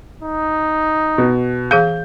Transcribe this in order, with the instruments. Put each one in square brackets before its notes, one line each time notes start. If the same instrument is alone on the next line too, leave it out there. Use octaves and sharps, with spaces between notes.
[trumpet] D#4
[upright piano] B2
[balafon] E3 G#4 F5 [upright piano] G6